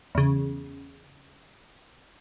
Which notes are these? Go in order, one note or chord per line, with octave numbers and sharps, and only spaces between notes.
E2 C#3